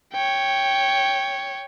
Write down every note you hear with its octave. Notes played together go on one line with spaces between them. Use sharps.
C#5 G5